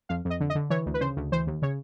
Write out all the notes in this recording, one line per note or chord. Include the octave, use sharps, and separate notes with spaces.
F2 F5
F2
D#5
D3
D#5
D3
E3 C#5
D2
B4
C#3 C5
D2
E3 C5
D#2
C#3 C#5